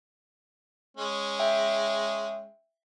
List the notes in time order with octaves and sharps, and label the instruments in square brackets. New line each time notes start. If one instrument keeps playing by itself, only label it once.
[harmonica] G#3 C#4
[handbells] E5 G5